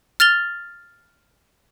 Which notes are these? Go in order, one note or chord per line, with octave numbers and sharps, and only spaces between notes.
F6 A6 F7 G7